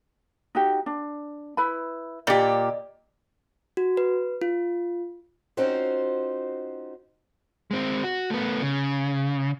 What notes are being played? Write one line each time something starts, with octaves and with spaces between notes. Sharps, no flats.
D#4 F#4 G4
D4
E4 B4 B5
A#2 G4 D5 D#5
F#4
B4
F4
C4 C#4 D#4 F4 F#4 C5
G#3 C4
F#4
A3 B3
C#3